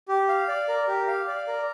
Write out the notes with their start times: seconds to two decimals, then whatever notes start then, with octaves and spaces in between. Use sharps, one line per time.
0.08 G4
0.29 F5
0.48 D5
0.68 A#4
0.88 G4
1.07 F5
1.27 D5
1.47 A#4